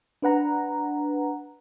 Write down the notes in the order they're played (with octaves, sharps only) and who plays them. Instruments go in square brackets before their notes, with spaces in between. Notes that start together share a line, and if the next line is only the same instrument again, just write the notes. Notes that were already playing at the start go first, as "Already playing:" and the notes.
[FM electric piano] D4 B4 F#5 A#5